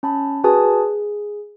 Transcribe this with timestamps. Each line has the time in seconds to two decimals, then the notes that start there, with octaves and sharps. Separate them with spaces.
0.03 C#4 A5 B5
0.44 F#4 G#4 B4 G#5 A5 D#6
0.66 G#4